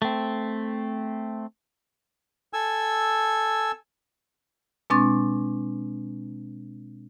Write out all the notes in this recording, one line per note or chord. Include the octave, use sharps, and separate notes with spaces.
A3 C4
A4 G#5 E6
B2 G#3 C4 D4 C#6 A6